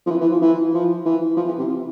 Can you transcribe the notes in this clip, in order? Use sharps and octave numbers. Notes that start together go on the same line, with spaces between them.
F3
E3
E3
F3
E3
F3
E3
F3
E3
C3